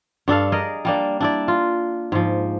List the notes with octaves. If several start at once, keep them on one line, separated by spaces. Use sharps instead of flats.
G2 D4 A4 F5
G#4 A#4 D5 D#5
G3 A#3 D4
D4 E4 D5
F4
G#2 F3